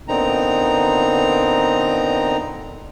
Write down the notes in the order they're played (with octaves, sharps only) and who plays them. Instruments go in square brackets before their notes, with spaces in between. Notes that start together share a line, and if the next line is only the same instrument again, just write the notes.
[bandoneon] A#2 D3 B3 C4 D#4 A#5